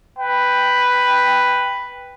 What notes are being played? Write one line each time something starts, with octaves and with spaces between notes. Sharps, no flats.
B4 G5